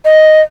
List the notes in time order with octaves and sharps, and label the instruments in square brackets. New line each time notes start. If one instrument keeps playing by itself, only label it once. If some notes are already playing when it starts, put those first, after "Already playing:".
[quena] D#5